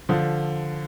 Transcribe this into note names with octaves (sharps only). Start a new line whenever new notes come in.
D3 F3